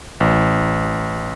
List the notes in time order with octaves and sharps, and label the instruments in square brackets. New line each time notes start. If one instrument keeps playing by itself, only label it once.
[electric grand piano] A1